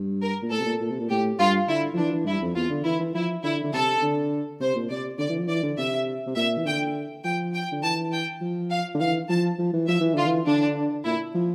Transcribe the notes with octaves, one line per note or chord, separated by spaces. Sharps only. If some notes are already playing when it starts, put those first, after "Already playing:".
Already playing: G2
A#4
A#2
A2 A4
C3
A#2
A#2
C3
A#2
A2 G4
G2 F4
D3 E4
F3
E3 D4
E3
G2 E4
F2
E2 F4
D3
E3 E4
E3
F3 E4
D3 E4
D3
C3 A4
D3
C3 C5
A#2
C3 D5
D3 D5
E3
F3
E3 D5
D3
C3 E5
C3
A#2 E5
E3
D3 G5
F3 G5
G5
D3
E3 A5
G5
F3
F5
D3
E3 F5
F3 A5
F3
E3
F3 E5
E3
D3 F4
E3
D3 D4
A#2 E4
F3